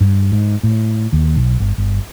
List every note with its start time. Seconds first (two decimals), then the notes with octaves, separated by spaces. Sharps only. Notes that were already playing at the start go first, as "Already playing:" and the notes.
0.01 G2
0.32 G#2
0.63 A2
1.13 D#2
1.36 B1
1.60 G1
1.78 G1